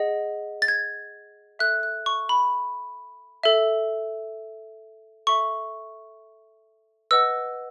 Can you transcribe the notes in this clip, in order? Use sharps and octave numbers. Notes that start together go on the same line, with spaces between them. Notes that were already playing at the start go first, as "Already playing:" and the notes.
Already playing: G#4 D#5 F#5
A6
G#6
A4 E5 F#6
F#6
C#6
B5
A4 E5
A4 E5 C#6
B4 D#5 F#5 E6